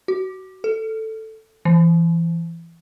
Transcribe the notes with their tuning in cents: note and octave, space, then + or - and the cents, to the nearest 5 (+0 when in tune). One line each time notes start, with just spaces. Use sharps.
F#4 +25
A4 +5
E3 +20